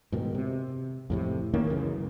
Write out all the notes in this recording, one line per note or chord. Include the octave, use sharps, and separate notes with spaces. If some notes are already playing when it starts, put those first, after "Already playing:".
G#2 B2 D#3
C3
F2 A2 C3
D#3 A#3 C#4
C#2 F#2 C#3 E3